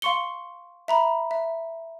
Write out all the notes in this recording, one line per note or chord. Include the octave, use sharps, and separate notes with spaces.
F5 C6 C#6 C#7 G7
E5 A#5 B5
E5